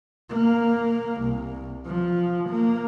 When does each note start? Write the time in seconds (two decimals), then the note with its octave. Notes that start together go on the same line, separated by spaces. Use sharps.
0.30 A#3
1.22 C2
1.86 F3
2.50 A#3